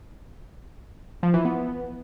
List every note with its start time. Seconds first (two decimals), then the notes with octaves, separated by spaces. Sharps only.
1.23 F3
1.34 E3
1.45 B3